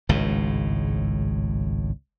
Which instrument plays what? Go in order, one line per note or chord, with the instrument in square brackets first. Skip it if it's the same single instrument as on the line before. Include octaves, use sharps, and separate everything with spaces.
[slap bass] G#1 C#2 A2